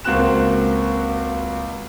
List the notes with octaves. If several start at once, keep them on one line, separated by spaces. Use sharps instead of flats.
C#2 A#3 C4 F#4 F#6 E7